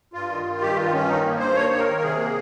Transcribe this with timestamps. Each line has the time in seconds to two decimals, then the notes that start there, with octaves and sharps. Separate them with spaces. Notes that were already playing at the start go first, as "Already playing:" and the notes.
0.13 G2 F4
0.30 D#3
0.46 D#3
0.61 G2 G4
0.76 D#3 F4
0.92 G2 C#4
1.08 D#3 D#4
1.24 A#3
1.39 G2 C5
1.55 A#3 C#5
1.71 D#3
1.79 A#4
1.87 D#3
2.02 C3 G#4
2.18 A#3